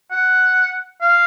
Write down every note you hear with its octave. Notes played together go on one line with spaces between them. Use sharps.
F#5
F5